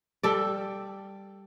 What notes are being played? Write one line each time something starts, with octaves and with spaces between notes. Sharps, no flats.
G3 A4 D5